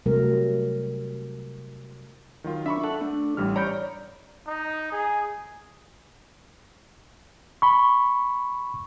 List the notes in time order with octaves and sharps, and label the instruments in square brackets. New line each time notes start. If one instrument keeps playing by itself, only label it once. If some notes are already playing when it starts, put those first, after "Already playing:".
[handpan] C3 F#3 G3 A3 A#4
[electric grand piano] D#3 F#3 F4
[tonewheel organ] D4 [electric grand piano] E5 B5 C#6
[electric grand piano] A4 [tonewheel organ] F#5
[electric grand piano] A3 [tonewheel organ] D4
[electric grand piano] A1 G3 F6
[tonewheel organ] C#5 D5 [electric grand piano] A#5 B5 G6
[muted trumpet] D#4
G#4
[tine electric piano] B5 C#6